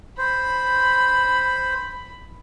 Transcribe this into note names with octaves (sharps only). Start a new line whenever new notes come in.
C5 B5